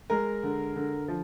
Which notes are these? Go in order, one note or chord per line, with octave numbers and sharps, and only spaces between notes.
G#3 A#4
D3
D3
F3